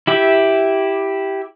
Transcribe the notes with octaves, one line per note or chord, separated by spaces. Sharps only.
E4 G4 E5